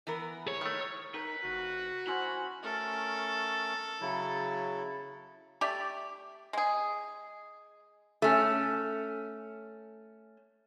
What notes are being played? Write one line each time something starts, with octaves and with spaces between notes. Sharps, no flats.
E3 B3 A#4
C#5
D#3 A3 E4
D#4 A#4 B4 G5
F1 F#4
F#3 C#4 E4 C5 B5
A3 C#4 A4 A#4
C#3 F#3 E4
A3 G4 D5
G#3 G#4
A3 C#4